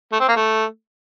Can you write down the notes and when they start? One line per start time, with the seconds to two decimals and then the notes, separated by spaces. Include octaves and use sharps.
0.12 A3
0.20 C4
0.28 A#3
0.36 A3